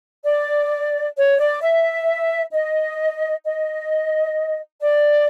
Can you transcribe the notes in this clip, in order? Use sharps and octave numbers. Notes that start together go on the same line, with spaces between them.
D5
C#5
D5
E5
D#5
D#5
D5